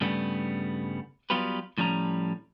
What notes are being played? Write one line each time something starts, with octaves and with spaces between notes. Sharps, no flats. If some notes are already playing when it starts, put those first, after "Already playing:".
G2 C#3 G3 A3 B3
F#3 G3 B3 F4 G4 B4
A2 F3 G3 C#4 A#5